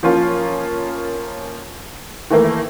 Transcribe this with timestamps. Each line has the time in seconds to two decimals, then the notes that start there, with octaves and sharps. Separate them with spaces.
0.03 F3 A#3 C#4 F4
2.30 D#3 E3 A3 A#3